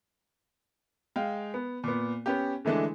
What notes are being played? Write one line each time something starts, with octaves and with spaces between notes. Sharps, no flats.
G#3 F5 G5
B3
A#2 B3
B3 C#4 G4
D3 E3 G#3 A3 D4